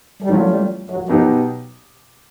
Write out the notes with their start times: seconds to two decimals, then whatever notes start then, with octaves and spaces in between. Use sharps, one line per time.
0.22 G3
0.29 E3 F#3 A3 C#4 F4
0.50 G3
0.90 F#3
1.09 B2 F3 F#3 B3 D#4 G4